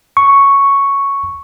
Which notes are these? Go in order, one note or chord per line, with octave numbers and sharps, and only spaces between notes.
C#6